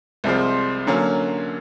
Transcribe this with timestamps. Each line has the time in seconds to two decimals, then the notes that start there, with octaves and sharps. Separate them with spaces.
0.24 C2 C3 F3 G#3 C4
0.87 D3 F#3 A#3 C#4